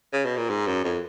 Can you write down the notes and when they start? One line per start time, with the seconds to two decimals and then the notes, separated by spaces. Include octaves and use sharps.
0.13 C#3
0.25 B2
0.37 A#2
0.49 G#2
0.67 F#2
0.84 F2